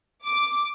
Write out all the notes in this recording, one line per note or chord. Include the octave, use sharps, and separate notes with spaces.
D6